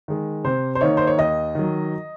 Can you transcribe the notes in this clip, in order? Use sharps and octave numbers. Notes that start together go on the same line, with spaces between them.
D#3 G#3
C3 C5
C5
D#3 A#3 D#4 C#5
C5
C#5
D#2 D#5
D#3 F#3